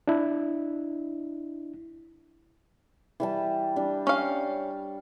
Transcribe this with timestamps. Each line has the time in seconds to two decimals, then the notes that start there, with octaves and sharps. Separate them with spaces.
0.08 D4 E4
3.20 E3 G3 A5
3.76 G3 D4
4.07 C#4 F5